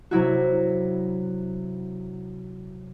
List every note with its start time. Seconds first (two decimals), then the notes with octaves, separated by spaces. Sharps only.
0.11 C3 F#3 E4 F#4